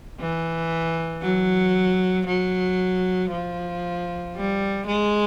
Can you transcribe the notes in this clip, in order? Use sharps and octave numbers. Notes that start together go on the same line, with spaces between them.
E3
F#3
F#3
F3
G3
G#3